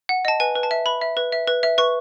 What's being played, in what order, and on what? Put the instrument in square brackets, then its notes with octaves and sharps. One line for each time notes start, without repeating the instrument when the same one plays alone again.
[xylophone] F#5
D#5 A5
B4 G#5
B4
A5
E5
B4 B5
E5
B4
E5
B4
E5
B4 C#6